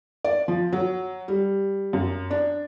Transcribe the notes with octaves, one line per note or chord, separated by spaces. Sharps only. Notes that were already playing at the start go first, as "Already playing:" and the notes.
D5
F3
F#3
G3
F#2
D4